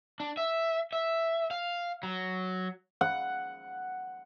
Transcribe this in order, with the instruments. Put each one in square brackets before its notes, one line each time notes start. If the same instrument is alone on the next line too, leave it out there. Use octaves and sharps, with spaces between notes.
[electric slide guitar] D4
E5
E5
F5
F#3
[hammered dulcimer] F#5